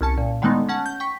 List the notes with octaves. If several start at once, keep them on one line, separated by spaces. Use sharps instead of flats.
C2 C#4 A5 C#7
A#2
D3 D#3 G#3 A3 B3 D#4
C#4 F#5 A5
G6
G5 C#6 B6